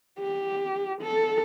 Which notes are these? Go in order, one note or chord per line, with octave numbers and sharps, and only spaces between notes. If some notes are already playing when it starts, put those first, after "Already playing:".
G4
A4